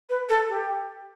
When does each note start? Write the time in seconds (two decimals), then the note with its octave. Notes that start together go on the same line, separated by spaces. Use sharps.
0.09 B4
0.29 A4
0.48 G4